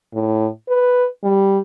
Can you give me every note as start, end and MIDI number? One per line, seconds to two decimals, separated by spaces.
0.14 0.48 45
0.68 1.07 71
1.23 1.59 55